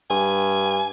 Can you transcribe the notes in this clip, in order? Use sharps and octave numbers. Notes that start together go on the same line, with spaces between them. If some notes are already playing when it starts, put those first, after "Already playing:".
G2 G#5